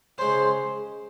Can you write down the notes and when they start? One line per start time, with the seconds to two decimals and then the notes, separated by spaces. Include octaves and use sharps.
0.18 C#3 G#3 C#4 C5